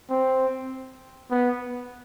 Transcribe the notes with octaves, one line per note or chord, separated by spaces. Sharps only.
C4
B3